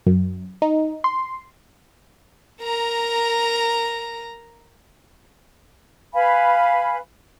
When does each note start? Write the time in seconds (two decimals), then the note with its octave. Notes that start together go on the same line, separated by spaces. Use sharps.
0.07 F#2
0.62 D#4
1.04 C6
2.61 A#4 A#5
6.14 B4 F5 G#5 B5